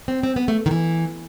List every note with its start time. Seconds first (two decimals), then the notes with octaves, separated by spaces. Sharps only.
0.08 C4
0.23 C4
0.36 B3
0.48 A3
0.66 D#3
0.71 E3